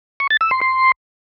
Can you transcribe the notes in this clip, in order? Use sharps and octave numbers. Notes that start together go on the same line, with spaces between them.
C#6
A6
E6
C6
C6